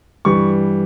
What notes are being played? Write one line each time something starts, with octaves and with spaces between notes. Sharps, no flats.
G2 E3 G3 C#6